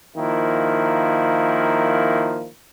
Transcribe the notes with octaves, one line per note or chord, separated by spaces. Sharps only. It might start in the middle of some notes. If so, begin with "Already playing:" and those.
D#3 F3 A#3 E4